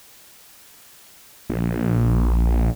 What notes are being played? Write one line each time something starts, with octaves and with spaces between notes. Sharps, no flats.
A#1